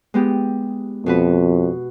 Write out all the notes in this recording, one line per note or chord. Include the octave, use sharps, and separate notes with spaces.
G#3 B3 G4
F2 B2 F#4 B4